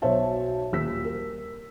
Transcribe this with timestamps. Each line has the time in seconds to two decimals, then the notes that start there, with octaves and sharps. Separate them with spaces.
0.02 B1 B2 C5 C#5 E5 A5
0.72 D#1 E6 B6
1.04 A#4